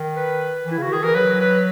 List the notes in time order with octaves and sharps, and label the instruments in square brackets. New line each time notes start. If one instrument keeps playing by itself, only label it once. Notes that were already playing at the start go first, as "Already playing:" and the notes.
Already playing: [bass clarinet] D#3
[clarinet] B4
[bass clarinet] E3
[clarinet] E4
[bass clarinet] C#3 [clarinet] F#4
[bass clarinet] D#3 [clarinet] G#4
[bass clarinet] E3 [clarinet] A#4
[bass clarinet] F#3 [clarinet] B4
[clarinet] B4